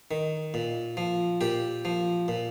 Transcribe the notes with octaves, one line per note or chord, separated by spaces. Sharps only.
D#3
A#2
F3
A#2 G4
F3
A#2